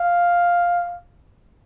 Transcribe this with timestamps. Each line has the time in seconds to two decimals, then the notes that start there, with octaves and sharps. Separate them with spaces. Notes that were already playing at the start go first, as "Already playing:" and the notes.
Already playing: F5